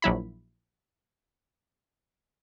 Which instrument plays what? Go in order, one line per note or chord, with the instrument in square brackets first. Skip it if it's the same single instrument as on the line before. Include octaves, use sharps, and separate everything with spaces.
[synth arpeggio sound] A#1 F#3 E4 B5